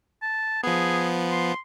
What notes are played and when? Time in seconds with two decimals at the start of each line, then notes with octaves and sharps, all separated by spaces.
0.22 A5
0.63 F3 B3 G#4
1.32 C6